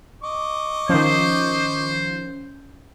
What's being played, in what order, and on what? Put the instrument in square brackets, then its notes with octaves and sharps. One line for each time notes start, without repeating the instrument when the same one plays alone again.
[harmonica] D#5 C#6 D6
[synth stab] D#3 F3 [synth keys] C#4 G6 [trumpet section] C5